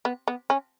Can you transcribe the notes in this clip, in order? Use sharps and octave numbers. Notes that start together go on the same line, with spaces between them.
B3
B3
C#4